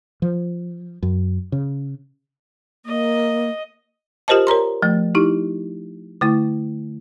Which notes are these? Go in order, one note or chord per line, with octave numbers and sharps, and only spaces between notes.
F3
F#2
C#3
A#3 D#5
F4 G4 A#4 C5 D#5 A5
A#4 C#5 A#5 C6
F3 A3
D#4 E4 G4
D3 A3 E4